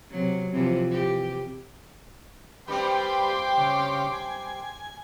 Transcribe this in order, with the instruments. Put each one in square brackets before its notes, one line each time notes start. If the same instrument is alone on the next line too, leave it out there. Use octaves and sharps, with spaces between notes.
[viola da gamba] C3 F#3
C3 E3 F3
E3 G4
[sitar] G2 G3 C4 [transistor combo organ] G4 B4 [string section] G5 C6 D6
[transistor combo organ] C#3
G#5